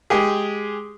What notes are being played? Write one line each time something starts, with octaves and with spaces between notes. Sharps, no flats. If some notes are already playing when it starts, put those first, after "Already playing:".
G#3 G4 G#4